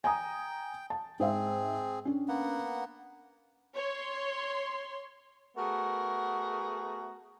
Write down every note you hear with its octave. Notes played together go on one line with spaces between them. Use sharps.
G5 G#5 A#5 D#6
A5
G#2 C4 G#4 C5 E5
C#4 D4
A#3 B3 F#5
C#5 C6
A3 B3 F#4 G#4 A#4